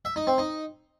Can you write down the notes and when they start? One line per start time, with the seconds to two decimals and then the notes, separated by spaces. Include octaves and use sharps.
0.05 E5
0.16 D#4
0.27 C4
0.38 D#4